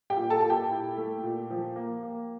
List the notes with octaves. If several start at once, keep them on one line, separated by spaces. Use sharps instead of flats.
G4 G5
A#2
A4 A5
A#2 A5
G4 G5
E4
A3
A#2
F3
A#3
A#3